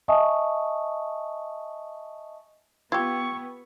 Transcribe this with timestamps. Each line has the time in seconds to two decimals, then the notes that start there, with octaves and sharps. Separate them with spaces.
0.08 D#5 E5 G#5 A5 C#6 D#6
2.92 B3 F4 G4 G5 C#6 E6 G#6